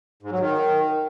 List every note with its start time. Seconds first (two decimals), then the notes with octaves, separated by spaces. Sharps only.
0.23 G#2
0.31 F#3
0.39 D#3